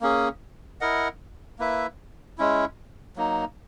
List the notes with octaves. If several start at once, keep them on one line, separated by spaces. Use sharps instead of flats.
A#3 C#4 G#4
E4 A#4 D#5 F#5
A#3 E4 B4 E5
G#3 C#4 E4
F#3 A#3 D#4